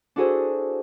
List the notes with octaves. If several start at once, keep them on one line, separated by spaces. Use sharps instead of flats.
D4 E4 F#4 G#4 A4 C5